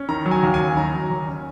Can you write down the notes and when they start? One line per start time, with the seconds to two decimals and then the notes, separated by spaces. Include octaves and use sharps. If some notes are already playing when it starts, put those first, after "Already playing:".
Already playing: C#4
0.09 D#3 A#5
0.26 F#3
0.31 G#5
0.43 D#2
0.54 G#5
0.59 C#4
0.77 D#3 A#5
0.93 F#3
1.10 D#2
1.27 C#4